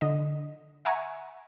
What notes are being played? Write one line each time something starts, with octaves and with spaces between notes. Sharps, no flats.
D3 D#5
E5 F#5 G#5 A#5 C#6